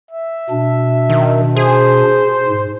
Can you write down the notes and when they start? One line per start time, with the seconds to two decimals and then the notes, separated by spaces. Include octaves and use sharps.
0.11 E5
0.50 B2 D4
1.09 D#3
1.56 G#4 C5
2.48 G#2